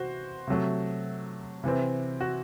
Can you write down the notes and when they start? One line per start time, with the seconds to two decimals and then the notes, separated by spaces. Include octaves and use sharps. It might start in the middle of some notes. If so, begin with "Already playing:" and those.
Already playing: C3 E3 F#4 C5
0.48 C3 F#3 A3
1.64 C3 E3 C4
2.21 F#4